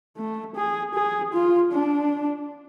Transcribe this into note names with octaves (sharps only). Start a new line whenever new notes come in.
A3
G#4
G#4
F4
D4